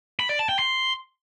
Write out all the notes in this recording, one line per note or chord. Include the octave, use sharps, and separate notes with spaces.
B5
D5
A5
G5
C6